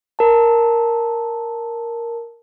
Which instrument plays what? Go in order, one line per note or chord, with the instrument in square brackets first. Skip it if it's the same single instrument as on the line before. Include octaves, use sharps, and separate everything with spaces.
[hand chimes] A#4 A5